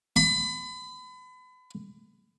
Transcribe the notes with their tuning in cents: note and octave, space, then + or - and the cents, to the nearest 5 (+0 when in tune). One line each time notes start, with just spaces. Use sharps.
B5 +35